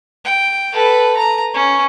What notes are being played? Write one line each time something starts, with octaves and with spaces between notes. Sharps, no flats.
G5
A4 B4
A#5
C#4